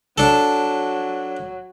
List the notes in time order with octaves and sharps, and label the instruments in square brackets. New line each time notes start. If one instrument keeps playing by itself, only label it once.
[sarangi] F#3 [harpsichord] D4 A4